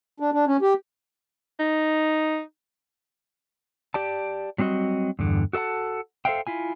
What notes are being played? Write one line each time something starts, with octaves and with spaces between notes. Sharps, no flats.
D4
D4
C#4
G4
D#4
G4 D5 A5
F#3 G3 C4 F#4 D#5
E2 G2 D3
F#4 A4 D#5 F#5 A5
A4 C5 C#5 E5 F5 G5
E4 F4 G#5